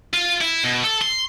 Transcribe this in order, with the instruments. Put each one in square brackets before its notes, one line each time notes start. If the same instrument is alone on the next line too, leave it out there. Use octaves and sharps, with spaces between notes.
[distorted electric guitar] F4
E4
B2
A4
C6